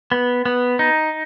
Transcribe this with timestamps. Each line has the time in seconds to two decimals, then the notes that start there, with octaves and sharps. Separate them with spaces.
0.12 B3
0.46 B3
0.79 D#4